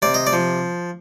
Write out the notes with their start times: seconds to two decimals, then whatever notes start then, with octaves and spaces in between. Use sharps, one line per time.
0.02 C3 D5
0.14 D#5
0.27 D5
0.33 F3